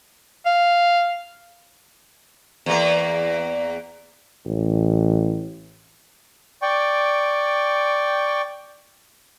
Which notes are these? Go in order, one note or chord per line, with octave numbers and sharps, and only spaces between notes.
F5
E2 A#3
A1
D5 G5 C#6